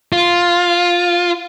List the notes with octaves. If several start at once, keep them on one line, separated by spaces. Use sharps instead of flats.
F4